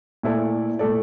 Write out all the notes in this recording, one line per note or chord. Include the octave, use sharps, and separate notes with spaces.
A#2 A3 E4 A4 D5
A#2 A3 E4 A4 D5